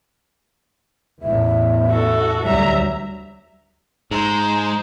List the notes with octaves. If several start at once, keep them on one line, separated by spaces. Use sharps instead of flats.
A1 E2 E5
F#4 A4
D2 F#3 G3 E5 A#5
G#2 G#3 C5 A#5